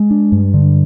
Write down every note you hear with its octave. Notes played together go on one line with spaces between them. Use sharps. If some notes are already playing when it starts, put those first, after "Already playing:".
Already playing: G#3
D4
G2
D3